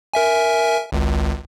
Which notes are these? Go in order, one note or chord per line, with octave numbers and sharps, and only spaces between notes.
A#4 E5 G#5
G#1 C#2